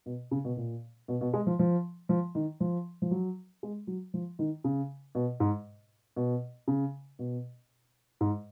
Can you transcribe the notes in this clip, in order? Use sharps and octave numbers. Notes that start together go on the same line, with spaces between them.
B2
C#3
B2
A#2
B2
B2
G#3
F3
F3
F3
D#3
F3
F3
F#3
G#3
F#3
F3
D#3
C#3
B2
G#2
B2
C#3
B2
G#2